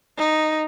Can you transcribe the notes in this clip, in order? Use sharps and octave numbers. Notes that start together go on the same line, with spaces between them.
D#4